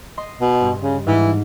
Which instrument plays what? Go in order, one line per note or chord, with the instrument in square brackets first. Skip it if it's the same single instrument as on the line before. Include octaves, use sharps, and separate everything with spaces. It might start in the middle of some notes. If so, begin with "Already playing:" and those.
[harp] D#5 C6
[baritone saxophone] B2
[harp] G2
[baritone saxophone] C#3
[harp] G#2 [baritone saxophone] E3